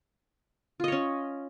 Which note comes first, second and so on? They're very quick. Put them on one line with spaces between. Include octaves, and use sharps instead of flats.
F4 D#5 C#5 C#4